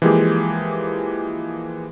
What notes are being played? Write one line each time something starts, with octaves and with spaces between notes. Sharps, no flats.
E3 F3 G#3 A#3 G4 G#4